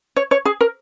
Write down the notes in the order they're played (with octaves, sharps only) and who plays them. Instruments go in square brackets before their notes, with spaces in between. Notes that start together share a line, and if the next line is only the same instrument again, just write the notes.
[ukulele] C#5
C#5
G#4
A#4